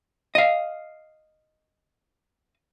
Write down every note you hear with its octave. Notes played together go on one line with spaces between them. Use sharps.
D#5 F5